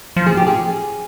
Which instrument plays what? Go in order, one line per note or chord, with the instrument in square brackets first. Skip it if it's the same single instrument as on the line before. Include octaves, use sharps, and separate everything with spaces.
[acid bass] F3
[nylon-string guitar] G#4
G4
G#4